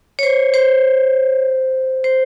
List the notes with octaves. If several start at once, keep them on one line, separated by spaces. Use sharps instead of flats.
C#5
C5
C5
C5